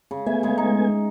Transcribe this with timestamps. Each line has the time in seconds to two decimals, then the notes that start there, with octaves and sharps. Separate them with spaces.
0.11 C#3
0.26 A3 B3 E5 G#5
0.43 C#3 G#3
0.58 D#4